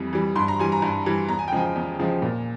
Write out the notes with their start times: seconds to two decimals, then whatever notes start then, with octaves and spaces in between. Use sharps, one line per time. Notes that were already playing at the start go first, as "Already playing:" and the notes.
Already playing: F2 E3 G3
0.13 E3 G3
0.36 G2 C6
0.48 A#5
0.59 E3 G3 G#5
0.72 A#5
0.82 G2
1.06 E3 G3
1.29 E2 A#5
1.39 G#5
1.48 G5
1.52 C#3 F3 G#3 G#5
1.76 E2
1.99 C#3 F3 G#3
2.22 A#2